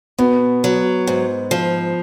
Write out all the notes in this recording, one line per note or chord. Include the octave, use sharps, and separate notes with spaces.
B2 B3
F#3
G#2
F3